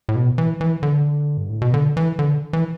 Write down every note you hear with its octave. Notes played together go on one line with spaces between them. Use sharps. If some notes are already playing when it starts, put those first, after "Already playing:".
A2
B2
E3
E3
D3
G2
A2
B2
D3
E3
D3
E3